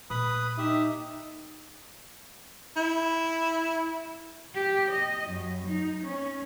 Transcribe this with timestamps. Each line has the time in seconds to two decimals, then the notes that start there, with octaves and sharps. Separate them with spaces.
0.10 A#2 B4 B5 D#6
0.58 D#4 G4 E5 D#6
2.77 E4
4.53 G4
4.89 D#5
5.28 F#2
5.65 D#4
6.03 C#4